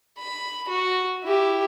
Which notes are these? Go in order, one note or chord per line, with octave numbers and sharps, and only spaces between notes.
B5
F#4
E4 G4